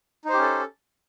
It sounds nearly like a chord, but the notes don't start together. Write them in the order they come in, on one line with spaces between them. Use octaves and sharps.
D#4 C5 G4 C#4 A4